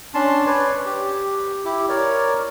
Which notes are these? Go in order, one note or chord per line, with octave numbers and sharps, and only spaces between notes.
C#4 D4 A5 C6
B4 C#5 D5
G4
E4 G4
A#4 C#5 D5